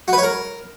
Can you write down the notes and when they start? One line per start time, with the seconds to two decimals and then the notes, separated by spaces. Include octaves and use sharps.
0.08 F#4
0.13 B4
0.18 C#5
0.23 A#4